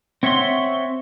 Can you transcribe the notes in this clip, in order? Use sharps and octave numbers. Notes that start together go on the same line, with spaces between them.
C4 C#5 E5 F#5 C6